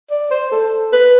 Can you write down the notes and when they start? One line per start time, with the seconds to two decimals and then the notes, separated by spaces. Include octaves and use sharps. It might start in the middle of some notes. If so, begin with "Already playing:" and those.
0.11 D5
0.31 C5
0.52 A4
0.93 B4